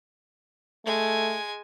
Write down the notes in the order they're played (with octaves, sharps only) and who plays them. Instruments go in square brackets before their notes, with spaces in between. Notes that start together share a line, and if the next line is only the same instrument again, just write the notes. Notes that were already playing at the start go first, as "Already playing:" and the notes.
[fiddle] G#3 G#5 [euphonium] A3